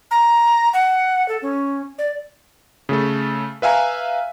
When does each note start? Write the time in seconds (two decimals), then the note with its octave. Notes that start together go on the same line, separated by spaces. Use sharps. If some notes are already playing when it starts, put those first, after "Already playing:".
0.11 A#5
0.73 F#5
1.29 A4
1.42 C#4
1.99 D5
2.89 C#3 A3 A4
3.62 B4 E5 F5 G#5 A#5